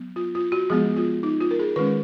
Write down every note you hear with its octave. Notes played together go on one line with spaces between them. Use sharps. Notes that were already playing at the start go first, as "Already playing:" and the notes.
Already playing: F#3 B3
F4
F4
F#4
F3 G#3 B3 G#4
F4
D#4
F4
A#4
G#4
D#3 G#3 C#4 B4